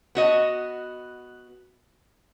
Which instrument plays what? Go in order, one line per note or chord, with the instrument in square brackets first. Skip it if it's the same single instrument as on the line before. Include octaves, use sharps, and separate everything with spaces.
[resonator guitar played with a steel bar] B3 F#4 D#5